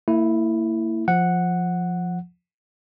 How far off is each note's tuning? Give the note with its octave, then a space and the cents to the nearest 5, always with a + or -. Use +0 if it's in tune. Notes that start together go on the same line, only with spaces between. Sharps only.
A#3 -40 E4 +0
F3 +5 F#5 -5